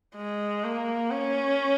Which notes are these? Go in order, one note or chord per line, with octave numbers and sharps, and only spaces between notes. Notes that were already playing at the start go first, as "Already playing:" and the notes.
G#3
A#3
C#4